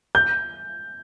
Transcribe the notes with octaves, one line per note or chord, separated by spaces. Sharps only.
G6